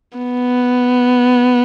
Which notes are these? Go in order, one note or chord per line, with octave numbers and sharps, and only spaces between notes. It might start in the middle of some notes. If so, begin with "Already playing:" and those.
B3